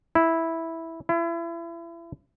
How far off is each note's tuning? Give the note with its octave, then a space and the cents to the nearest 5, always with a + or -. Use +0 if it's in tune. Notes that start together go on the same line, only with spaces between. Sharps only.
E4 -5
E4 +35